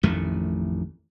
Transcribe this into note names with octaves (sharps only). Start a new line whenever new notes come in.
A1 F2 D#3 A3